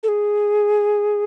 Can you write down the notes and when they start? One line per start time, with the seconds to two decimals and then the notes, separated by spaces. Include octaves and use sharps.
0.03 A4
0.08 G#4